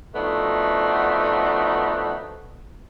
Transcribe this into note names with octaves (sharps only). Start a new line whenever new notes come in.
F3 A3 B3 D4 D#4 F#4